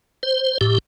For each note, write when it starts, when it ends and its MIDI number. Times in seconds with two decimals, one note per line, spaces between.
0.23 0.58 72
0.61 0.78 45
0.61 0.78 67